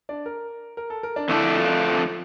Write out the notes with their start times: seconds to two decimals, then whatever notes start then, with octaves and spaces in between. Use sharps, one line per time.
0.09 D4 D5
0.26 A#4
0.77 A#4
0.90 A4
1.03 A#4
1.16 D4 D5
1.29 F2 D3 A3 D4 E4 A4 E5
1.54 F4 F5